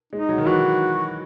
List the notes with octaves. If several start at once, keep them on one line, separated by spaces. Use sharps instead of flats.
G#3 D#4
F#3
D#3
E3 F#4